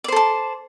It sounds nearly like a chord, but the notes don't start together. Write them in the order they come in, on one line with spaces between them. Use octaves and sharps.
D5 C5 A4 A5